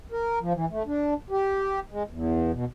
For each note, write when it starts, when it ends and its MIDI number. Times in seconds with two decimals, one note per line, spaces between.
0.12 0.39 70
0.41 0.53 53
0.54 0.66 52
0.70 0.83 57
0.86 1.14 62
1.30 1.80 67
1.91 2.03 56
2.10 2.52 40
2.52 2.65 47